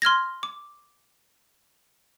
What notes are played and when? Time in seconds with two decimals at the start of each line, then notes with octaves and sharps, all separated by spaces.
0.02 C6 F6 G#6 A#6
0.43 D6